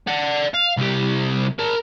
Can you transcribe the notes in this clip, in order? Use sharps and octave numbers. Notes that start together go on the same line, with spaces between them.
D5 F#5
F5
C2 G4
A#4 A5